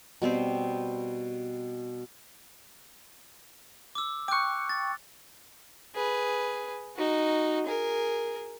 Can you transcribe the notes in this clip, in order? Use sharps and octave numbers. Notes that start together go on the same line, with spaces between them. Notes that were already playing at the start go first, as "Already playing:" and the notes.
B2 G3 C4 C5
D6 E6
G5 C#6 D6 F#6
A6
G#4 B4
D#4 F#4
G#4 A#4